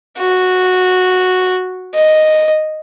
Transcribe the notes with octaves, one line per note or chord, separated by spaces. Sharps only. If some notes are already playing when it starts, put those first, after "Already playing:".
F#4
D#5